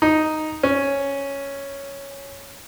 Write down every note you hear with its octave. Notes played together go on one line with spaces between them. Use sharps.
D#4
C#4